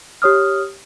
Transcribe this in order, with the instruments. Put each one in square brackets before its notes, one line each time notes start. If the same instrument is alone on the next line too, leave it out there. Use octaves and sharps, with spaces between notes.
[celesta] G4 C#5 D#6 F6